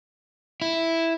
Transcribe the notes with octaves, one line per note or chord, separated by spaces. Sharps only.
E4